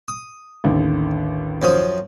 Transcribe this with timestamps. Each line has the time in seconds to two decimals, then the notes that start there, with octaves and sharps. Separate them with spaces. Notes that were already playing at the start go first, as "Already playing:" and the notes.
0.08 D#6
0.64 A1 D#2 D3
1.62 F#2 F3 D#6